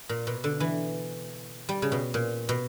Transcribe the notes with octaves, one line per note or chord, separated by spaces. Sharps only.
A#2
B2
D3
E3
G3
C#3
B2
A#2
B2